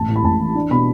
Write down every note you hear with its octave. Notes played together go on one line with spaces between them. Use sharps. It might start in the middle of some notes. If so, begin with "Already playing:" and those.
Already playing: A1 A5
A2
B5
A1 A5
E3
D4
B2 B5